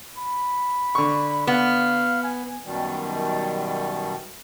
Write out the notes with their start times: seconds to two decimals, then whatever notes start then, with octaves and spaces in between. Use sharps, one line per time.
0.18 B5
0.95 D3 C#6
1.47 B3 F5
2.23 G#5
2.66 F#2 B2 D#3 G3